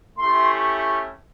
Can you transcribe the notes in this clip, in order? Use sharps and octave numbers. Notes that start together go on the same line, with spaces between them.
A3 C#4 E4 G4 C6